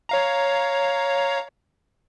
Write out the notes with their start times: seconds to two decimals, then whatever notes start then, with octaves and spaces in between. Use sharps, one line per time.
0.09 C#5 F5 A#5